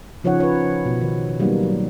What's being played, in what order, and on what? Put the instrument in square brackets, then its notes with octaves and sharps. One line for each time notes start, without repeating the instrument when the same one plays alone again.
[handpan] C#3 F3 C#4 D#4 C#5 F#5
B4 C#5
B2
D#3
F#3 G3 A#3 B3 D#4
F#3